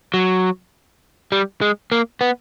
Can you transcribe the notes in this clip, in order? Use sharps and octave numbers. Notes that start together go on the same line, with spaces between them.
F#3
G3
G#3
A#3
B3